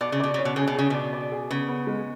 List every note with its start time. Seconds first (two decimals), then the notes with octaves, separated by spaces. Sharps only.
0.01 B2 D5
0.12 C#3
0.20 B2 D5
0.34 C#3 C#4
0.45 B2
0.56 C#3 G#4
0.68 B2
0.75 C#3 G#4
0.90 B2 D5
1.13 D5
1.32 G#4
1.50 C#3 B3
1.68 B3
1.87 G#3